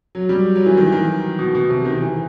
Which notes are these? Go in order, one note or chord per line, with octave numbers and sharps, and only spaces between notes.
F#3
G3
F#3
E3
D#3
E3
D#3
B2
B2
C3
D#3
E3